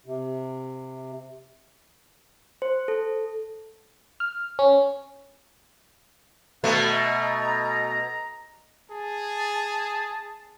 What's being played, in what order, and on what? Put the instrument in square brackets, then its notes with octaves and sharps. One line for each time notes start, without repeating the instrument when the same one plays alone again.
[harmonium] C3
[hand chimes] C5
A4
[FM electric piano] F6
C#4
[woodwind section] G2 B3 F#5 [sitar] B2 A3
[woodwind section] D#5 A#5
[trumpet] G#4 [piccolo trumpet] A5